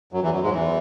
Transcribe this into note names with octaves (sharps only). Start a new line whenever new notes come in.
F#2 F#3
E2 E3
F#2 F#3
G#2 G#3
F#3
E2 E3